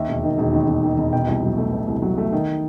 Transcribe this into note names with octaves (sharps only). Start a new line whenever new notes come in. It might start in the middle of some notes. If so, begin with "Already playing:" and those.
Already playing: D#2 E5
E1
D#3
E1
D#2
E1
D#3
E1
B2 G5
C2
F#3
A3
B2
C2
F#3
A3
D#3